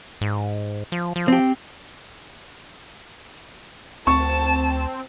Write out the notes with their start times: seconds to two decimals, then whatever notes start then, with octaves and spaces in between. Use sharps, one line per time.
0.21 G#2
0.92 F3
1.16 F3
1.28 C4 G4
4.07 D2 C4 A5 C#6